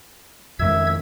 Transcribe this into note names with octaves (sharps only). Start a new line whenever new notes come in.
F2 D#3 G#3 E5 E6 G#6